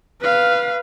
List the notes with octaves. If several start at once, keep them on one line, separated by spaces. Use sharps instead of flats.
B4 F5